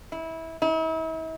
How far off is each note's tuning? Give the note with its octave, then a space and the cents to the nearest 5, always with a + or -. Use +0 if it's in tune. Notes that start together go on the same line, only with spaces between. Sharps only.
E4 -20
E4 -45